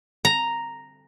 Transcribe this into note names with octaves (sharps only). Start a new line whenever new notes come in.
A#5